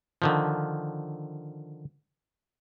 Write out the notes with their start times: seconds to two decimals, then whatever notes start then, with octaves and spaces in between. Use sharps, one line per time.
0.22 D3 D#3 F3